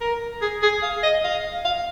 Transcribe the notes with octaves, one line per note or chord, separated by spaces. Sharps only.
A#4
G#4
G#4
F5
D#5
F5
F5